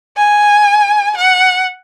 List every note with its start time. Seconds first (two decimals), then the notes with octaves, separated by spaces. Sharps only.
0.17 G#5
1.17 F#5